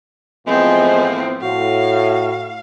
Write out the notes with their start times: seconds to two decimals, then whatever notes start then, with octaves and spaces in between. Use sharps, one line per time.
0.47 A2 E3 F3 G#3 B3 C4
1.42 A2 F#4 F5